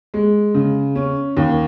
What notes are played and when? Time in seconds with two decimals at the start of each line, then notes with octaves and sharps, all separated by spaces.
0.14 G#3
0.54 C#3
0.95 C#4
1.37 D#2